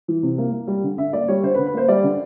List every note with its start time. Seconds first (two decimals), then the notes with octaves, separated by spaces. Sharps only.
0.08 E3
0.23 C3
0.38 A#3
0.53 A#3
0.67 G3
0.84 D3
0.98 D3 E5
1.13 A#3 D5
1.28 G3 C#5
1.43 D3 C5
1.54 B4
1.59 D3
1.66 B4
1.73 A#3 C5
1.88 G3 D5
2.04 D3